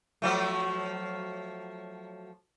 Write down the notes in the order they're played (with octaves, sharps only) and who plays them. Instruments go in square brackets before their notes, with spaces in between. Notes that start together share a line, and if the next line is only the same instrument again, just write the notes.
[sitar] F3 F#3 A3